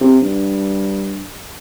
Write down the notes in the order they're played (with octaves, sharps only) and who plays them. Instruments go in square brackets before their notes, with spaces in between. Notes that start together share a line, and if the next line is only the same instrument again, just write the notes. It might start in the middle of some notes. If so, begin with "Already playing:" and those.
[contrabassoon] C3
G2